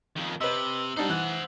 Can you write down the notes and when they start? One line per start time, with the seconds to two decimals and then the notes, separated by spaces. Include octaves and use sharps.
0.16 F2 D#3
0.41 C3 B4 D#5 E6 F#7
0.97 G3 D4 D#4 C5 F#5
1.09 E3 F#6